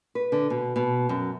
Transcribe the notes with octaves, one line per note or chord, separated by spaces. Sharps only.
B4
D3
B2
B2
F#2